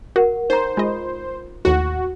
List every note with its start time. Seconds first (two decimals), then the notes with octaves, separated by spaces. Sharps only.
0.16 F#4 A#4 F#5
0.50 D#4 C5 A#5
0.77 G#3 F4 D#5
1.65 D#2 A2 F#4